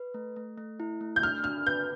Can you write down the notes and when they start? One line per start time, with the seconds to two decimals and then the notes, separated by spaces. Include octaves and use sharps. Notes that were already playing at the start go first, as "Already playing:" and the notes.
Already playing: B4
0.14 A3
0.36 A3
0.58 A3
0.80 E4
1.01 A3
1.16 G6
1.23 D4 F6
1.44 D4 F6
1.66 B4 G6